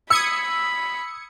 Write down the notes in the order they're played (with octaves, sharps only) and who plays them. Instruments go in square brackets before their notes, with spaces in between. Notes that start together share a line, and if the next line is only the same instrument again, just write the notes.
[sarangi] B5 [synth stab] D#6 G#6 C#7 [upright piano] E6